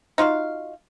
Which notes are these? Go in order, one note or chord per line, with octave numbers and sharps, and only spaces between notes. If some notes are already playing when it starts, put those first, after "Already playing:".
D#4 F4 F#4 F5